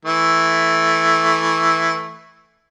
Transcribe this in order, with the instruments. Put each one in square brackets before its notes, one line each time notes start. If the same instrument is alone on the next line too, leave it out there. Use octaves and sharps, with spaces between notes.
[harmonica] E3 A3